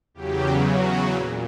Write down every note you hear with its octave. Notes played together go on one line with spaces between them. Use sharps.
E2 C#3 F#3 G4
F#4
A#2